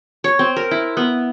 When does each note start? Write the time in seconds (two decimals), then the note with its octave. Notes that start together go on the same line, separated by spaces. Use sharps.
0.24 C#5
0.39 C4
0.56 A#4
0.71 E4
0.97 B3